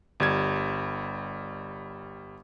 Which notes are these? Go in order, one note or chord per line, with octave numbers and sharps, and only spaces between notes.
G1 G3 G#6